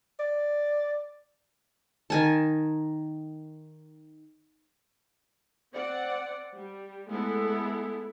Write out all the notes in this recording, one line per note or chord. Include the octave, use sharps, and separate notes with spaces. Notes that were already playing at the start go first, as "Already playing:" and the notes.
D5
D#3 G#5 A5
C4 D5 F#5
G3
G#3 A3 B3 E4 A4